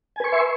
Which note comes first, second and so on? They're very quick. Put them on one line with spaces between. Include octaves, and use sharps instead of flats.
G#5 B4 C#6 C6 E5